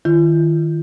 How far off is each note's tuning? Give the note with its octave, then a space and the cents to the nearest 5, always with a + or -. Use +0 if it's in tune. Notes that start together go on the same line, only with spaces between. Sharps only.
D#3 +0 F4 -45